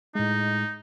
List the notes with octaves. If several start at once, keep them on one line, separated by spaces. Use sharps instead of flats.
A2 G#3 D#4